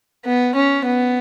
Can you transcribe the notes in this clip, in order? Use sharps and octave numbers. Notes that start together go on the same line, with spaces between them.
B3
C#4
B3